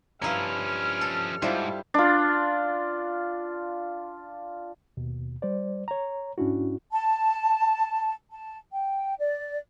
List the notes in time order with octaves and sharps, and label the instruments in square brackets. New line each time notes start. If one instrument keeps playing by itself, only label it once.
[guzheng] G2 E4 [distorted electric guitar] F3 C#4 [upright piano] F5 A#5 [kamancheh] F6
[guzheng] A4
[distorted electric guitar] G#2 [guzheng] G3 D4 [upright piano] E4 F4 C5
[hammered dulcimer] D4 F4
[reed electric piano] D#2 B2
G3 C5 D5
C#5 A#5
G#2 C#4 D4 E4 F#4
[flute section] A5
A5
G5
D5